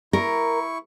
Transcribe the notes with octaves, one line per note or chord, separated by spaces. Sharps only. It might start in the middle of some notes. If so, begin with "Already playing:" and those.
E4 A#4 C#6